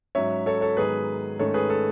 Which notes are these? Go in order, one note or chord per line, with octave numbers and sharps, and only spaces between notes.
G#2 F#3 C#4 C#5 E5
A4 C#5
A4 C#5
G#2 D#3 F#3 B3 G#4 B4
G#2 D#3 A3 C#4 A4 C#5
G#4 B4
A4